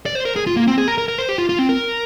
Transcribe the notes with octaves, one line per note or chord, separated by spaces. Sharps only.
D5
C5
A#4
G#4
F4
A#3
C4
G#4
A#4
A#4
A#4
C5
G4
F4
F4
C4
A#4